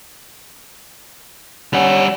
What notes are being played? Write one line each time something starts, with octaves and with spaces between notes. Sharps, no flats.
G3 C#4 F#5